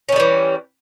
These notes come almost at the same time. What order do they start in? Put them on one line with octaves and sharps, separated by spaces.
C#4 D#3 G3 E3